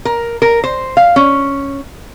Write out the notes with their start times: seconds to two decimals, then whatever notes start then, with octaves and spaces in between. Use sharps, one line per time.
0.05 A#4
0.42 A#4
0.64 C5
0.97 F5
1.16 C#4